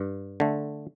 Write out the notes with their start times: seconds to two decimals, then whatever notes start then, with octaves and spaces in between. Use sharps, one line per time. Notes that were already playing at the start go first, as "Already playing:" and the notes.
Already playing: G2
0.40 D3 A3